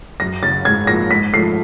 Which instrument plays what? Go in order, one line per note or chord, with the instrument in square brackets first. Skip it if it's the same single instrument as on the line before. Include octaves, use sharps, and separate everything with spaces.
[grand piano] F#2 [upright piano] A#6
[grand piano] C#3 F#3 [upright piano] A6
[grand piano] G#2 [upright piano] G#6
[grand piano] F3 A#3 [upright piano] A#6
[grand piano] G#2 [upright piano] B6
[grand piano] F3 A3 [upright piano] C7